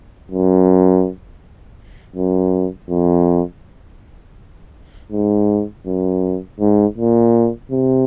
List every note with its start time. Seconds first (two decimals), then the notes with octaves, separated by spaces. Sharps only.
0.31 F#2
2.15 F#2
2.89 F2
5.12 G#2
5.86 F#2
6.60 G#2
6.97 A#2
7.71 C3